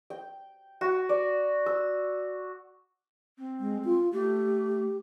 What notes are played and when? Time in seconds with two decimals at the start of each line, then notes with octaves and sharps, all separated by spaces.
0.10 G5
0.81 F#4
1.09 D5
1.66 E6
3.38 C4
3.60 G#3
3.85 F4
4.13 A3 G4